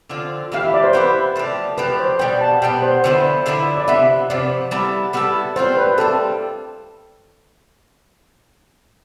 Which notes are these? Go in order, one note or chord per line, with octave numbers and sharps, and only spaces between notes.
D3 F3 C4 F4
E3 B3 E4 G4 F5
E5
D5
C5
E3 B3 E4 G4 B4
F3 A3 D4 G4
F3 A3 D4 G4 B4
C5
B2 G3 B3 G5
A5
B2 G3 B3 G5
C5
D3 F3 B3 E4 C5
D3 F3 B3 E4
D5
C3 F3 B3 E5
C3 F3 B3 D5
G3 B3 E4 A4
G3 B3 E4 A4
G3 C4 F4 C5
B4
G3 C4 F4 A4